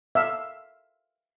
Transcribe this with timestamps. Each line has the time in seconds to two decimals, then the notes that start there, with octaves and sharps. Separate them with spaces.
0.15 E5 F5 E6